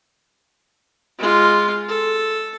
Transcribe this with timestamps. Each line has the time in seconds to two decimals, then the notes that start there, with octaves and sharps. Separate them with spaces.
1.19 G#3 F4
1.89 A4